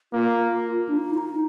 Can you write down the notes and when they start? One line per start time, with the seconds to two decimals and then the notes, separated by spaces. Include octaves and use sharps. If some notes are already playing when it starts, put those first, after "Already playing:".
0.13 A#3 F4
0.89 D4
0.97 D#4
1.14 F4
1.18 D#4